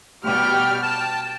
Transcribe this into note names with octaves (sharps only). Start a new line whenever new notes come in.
B2 G3 G4 G5 F6
G5 A5